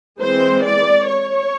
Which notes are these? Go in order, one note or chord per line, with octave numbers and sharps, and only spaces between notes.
E3 G#3 C4 C5
D5
C#5